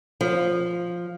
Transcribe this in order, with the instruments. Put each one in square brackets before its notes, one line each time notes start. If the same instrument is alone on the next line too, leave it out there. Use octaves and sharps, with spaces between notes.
[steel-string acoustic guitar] F3